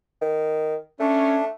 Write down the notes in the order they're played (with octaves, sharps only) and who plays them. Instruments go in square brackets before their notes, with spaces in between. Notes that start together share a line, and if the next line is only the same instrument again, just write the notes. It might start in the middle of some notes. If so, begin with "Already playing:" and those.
[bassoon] D#3
[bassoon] A3 [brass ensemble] C#4 [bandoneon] D4